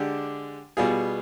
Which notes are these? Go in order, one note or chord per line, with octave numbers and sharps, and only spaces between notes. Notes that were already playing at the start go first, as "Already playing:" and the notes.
Already playing: D3 G#3 D4 G4
B2 G3 B3 F4 G#4